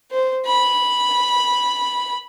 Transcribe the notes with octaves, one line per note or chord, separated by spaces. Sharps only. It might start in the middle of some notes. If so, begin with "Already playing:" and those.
C5
B5